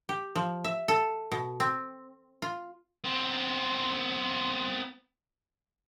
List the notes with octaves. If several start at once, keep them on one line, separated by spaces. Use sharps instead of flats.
G4
F3
E5
A4
B2
C4
F4
B3 C4